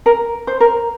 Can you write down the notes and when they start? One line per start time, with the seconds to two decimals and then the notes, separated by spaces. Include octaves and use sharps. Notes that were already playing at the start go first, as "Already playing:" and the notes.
0.06 A#4
0.47 C5
0.60 A#4